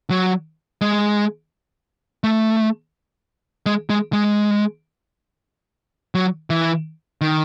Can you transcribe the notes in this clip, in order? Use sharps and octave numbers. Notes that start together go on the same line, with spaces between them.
F#3
G#3
A3
G#3
G#3
G#3
F#3
E3
D#3